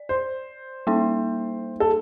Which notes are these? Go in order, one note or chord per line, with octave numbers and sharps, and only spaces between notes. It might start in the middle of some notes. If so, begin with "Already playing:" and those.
Already playing: D5
C5
G3 A#3 D#4
A4